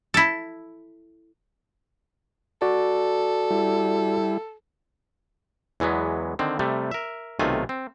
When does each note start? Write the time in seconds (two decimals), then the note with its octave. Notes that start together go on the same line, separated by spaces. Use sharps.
0.14 E4 A4
2.62 F#4 A4 D5
3.51 G3 E4
5.80 E2 E3 F#3 G#3 B3
6.39 D3 D#3 C4
6.59 C3 G3 A3
6.91 A#4 E5
7.39 B1 C3 D#3 A3 F4 G#5
7.69 C4